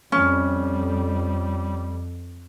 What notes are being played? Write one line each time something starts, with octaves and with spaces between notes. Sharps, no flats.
F2 G3 C#4